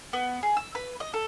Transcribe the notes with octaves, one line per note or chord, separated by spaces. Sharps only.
B3
G#4
E6
B4
D#5
A4